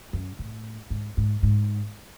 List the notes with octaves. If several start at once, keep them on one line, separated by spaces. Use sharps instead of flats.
F#2
A2
G#2
G#2
G#2